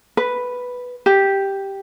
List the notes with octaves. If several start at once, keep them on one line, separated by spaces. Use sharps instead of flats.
B4
G4